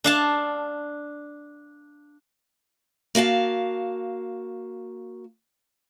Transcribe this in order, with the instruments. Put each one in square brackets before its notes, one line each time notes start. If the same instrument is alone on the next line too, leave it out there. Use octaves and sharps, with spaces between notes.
[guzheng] D4 F5 A5
[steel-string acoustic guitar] A#3 F#4 F5 A5